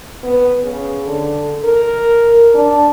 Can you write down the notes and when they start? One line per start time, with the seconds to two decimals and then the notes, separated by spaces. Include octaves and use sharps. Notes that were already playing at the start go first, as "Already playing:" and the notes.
0.24 B3
0.64 C#3
1.06 D3
1.65 A#4
2.54 D4